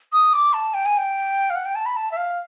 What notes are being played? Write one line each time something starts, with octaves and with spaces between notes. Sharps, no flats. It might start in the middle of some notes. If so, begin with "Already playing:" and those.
D#6
D6
A5
G5
G#5
G5
F5
F#5
G5
A5
B5
A5
E5
F5